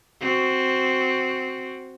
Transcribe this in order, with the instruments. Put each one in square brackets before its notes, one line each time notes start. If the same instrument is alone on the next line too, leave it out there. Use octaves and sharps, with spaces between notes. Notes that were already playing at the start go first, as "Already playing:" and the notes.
[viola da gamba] C4 F#4